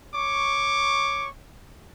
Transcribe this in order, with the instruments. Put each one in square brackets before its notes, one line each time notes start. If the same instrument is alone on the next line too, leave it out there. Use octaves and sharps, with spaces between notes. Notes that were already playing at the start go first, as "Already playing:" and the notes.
[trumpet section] C#5 C#6 D6